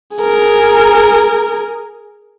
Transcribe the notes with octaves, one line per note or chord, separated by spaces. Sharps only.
G#4 A#4